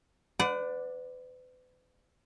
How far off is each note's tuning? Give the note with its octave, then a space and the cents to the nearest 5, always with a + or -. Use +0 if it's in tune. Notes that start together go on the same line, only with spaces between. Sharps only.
B4 +40 D5 +5 F#5 -15